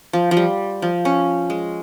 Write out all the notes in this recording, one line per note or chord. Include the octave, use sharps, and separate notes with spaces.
F3
F3
G3
F3
C#4
G#3